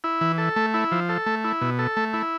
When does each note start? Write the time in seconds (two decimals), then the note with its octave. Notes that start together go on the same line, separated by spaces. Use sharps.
0.04 E4
0.21 E3
0.38 A4
0.56 A3
0.74 E4
0.92 F3
1.09 A4
1.26 A3
1.44 E4
1.61 B2
1.79 A4
1.97 A3
2.13 E4